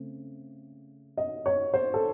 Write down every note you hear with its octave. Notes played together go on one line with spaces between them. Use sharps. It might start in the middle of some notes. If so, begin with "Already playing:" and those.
Already playing: C#3 A3 C4
D#5
C#5
C5
A4